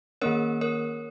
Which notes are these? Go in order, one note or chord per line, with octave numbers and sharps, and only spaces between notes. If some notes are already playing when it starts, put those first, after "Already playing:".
D#3 A#3 C#4 A#4 C#5
A#4 C#5